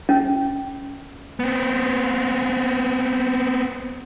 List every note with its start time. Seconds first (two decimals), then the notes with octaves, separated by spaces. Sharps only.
0.09 C#4
1.40 B3 C4